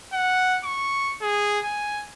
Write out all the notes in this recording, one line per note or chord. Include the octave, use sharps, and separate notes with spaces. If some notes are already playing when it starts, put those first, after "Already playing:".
F#5
C#6
G#4
G#5